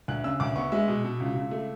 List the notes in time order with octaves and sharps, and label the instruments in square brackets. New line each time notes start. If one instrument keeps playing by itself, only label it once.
[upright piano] D2 F#6
C#3 E6
D2 D6
B3 C#6
G#3 E5
B2
B2
C#2
C#2
A3